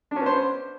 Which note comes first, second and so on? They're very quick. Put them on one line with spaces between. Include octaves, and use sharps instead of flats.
D4 C#4 B3 C5